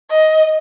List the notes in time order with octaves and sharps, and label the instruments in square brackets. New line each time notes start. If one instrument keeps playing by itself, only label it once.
[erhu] D#5